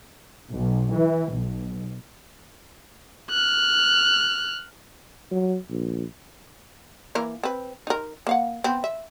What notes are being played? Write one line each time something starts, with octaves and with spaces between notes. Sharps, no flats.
B1
E3
B1
F6 F#6
F#3
A#1
E3 A#3 A#4
C4 B4
D#4 A#4
A#3 F5 F#5
B3 C4
E5